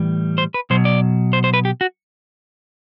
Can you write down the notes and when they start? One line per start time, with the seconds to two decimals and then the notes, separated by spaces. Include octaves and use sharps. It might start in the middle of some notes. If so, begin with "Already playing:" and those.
Already playing: A2 E3 G3
0.38 C5
0.54 B4
0.70 B2 F#3 C5
0.85 D5
1.33 C5
1.44 C5
1.54 B4
1.65 G4
1.81 F#4